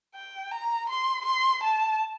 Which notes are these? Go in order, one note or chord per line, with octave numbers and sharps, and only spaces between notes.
G5
A#5
C6
C6
A5